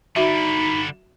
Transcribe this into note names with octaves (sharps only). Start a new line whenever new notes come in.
D3 G3 D#4 F#4 E5 B5